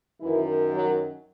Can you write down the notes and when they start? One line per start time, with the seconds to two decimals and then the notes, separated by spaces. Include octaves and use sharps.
0.20 F#2 D#3 E3 E4
0.72 F#3 F#4